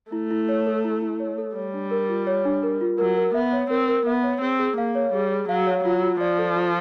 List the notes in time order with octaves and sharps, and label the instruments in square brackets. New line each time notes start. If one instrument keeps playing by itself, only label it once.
[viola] A3 [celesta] E4
[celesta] E4
C#5
A4
E4
E4
C#5
A4
[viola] G3 [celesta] C#5
[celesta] D4
A#4
F4
C#5
D4
A#4
F4
[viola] F#3 [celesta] A#4
[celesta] A#4
[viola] B3 [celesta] E5
[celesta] C#5
[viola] C4 [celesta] A#4
[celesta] A#4
[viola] B3 [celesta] E5
[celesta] C#5
[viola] C4 [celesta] G#4
[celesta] G#4
[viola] A#3 [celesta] F5
[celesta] C#5
[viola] G3 [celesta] G#4
[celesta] G#4
[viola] F#3 [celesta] F5
[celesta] C#5
[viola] F#3 [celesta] F4
[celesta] F4
[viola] F3 [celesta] D5
[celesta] A4
F4